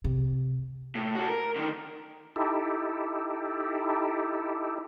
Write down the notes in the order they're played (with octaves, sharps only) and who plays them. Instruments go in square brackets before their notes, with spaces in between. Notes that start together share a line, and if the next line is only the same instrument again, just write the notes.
[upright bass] C3
[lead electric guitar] A2
F#4 A4
A#4
D3 D#3
[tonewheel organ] D#4 E4 G4 A4